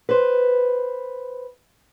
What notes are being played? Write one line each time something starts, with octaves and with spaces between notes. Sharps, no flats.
B4 C5